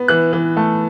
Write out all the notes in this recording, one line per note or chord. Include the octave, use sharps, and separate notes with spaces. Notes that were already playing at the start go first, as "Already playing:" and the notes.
Already playing: B3
E3 F#6
E3
A3